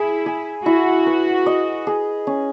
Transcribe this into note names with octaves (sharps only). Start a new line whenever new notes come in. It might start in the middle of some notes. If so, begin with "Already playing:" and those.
Already playing: E4 G#4
G#4
E4 F#4
B4
D#5
G#4
C#4